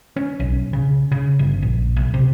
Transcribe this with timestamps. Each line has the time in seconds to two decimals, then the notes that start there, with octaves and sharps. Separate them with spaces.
0.16 C#4
0.40 B1
0.73 C#3
1.12 C#3
1.39 G1
1.62 A#1
1.96 B1
2.14 C3